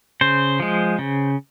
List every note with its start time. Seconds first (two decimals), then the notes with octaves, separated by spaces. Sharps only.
0.21 C#3 C5
0.60 F3 G#3
0.99 C#3